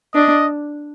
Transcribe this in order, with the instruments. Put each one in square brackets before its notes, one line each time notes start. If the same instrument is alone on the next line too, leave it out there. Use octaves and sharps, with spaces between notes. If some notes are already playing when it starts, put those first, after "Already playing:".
[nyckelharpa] D4 [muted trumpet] D#5